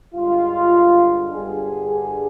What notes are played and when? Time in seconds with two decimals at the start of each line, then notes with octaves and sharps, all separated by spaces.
0.14 G2 D3 G#3 F4
1.33 G1 G2 D3 G3 G#4
1.92 G#4